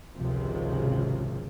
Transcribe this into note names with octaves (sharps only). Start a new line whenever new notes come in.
G#1 C#2 C3 F3